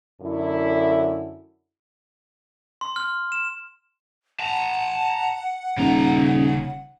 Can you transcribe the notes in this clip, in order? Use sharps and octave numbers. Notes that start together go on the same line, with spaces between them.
F#2 D3 E4
C6
F6
E7
F#5 A5 A#5
D#1 C#3 A#5